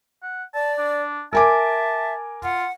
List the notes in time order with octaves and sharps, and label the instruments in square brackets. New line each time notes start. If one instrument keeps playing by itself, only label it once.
[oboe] F#5
[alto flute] D5 [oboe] A5
[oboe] D4
[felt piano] A#4 G#5 D6 [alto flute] E5 [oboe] A5
[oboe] F4 [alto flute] F#5